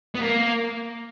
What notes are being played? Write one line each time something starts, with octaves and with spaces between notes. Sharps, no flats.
B3
A#3